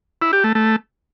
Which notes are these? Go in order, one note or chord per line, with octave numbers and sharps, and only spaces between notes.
E4
G4
A3
A3